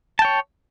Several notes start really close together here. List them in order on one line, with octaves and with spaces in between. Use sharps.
A5 G5 C#5